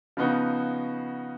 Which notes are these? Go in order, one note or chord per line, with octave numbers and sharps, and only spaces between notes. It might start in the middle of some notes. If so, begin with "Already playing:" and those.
C#3 F3 B3 D#4 F#4